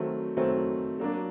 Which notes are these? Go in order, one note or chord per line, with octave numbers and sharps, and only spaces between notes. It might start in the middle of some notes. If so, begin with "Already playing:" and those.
Already playing: D#3 F#3 A3 C4
D#3 F#3 A3 C4
F#3 A#3 D4